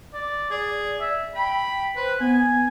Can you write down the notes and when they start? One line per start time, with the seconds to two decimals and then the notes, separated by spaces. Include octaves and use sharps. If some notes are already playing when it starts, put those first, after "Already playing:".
0.14 D5
0.50 G#4 D5
1.00 E5
1.35 G5 B5
1.96 B4 C5
2.20 B3 G#5